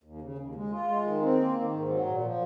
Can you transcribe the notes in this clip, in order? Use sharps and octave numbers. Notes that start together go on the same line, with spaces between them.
D#2
C#3
D#2
G#3
F4
G#3
D#3
C4
A#3
D#3
G#2
F#3
A#2
F3